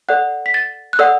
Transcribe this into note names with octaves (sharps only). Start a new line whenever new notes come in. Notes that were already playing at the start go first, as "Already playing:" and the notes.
A4 D5 F#5 F#6
B6
A6
F#6
A4 D5 F#5 E6